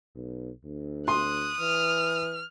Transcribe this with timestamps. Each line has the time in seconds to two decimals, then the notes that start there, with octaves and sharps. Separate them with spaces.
0.15 B1
0.65 D2
1.08 C6 D#6 F#6
1.60 E3 F6